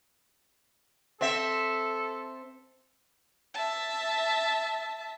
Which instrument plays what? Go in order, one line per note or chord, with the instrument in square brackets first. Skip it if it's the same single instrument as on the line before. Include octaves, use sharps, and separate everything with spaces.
[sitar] C4 E5 [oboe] A4
[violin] E5 A5